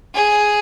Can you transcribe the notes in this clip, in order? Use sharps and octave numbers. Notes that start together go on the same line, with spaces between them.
G#4